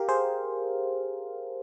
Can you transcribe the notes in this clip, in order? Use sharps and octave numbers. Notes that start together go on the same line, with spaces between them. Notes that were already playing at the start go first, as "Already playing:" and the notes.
Already playing: G4 A#4 F5
G#4 C5